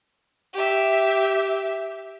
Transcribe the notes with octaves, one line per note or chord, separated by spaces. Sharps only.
G4 E5